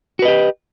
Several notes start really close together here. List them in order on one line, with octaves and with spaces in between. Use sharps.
F#4 B4 D#5 G4